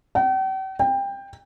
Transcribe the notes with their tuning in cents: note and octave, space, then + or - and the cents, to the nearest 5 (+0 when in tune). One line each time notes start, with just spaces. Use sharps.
G5 -45
G5 +20